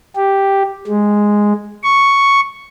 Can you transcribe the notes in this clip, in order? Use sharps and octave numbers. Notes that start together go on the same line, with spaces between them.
G4
G#3
C#6